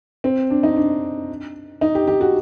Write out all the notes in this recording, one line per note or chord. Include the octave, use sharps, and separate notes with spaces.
C4
D4
D#4
D4
D#4
G4
G4
F#4